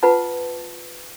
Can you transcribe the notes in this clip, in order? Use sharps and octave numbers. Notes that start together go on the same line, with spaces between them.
F4 B4 F#5 A5